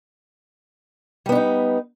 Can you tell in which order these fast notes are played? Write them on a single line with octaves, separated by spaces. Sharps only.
G3 B3 D4 D#4